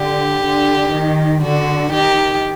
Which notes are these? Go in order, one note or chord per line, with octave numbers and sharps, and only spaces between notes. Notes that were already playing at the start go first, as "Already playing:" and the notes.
Already playing: D3 G4
D3
D#3
D3 F#4
D#3 G4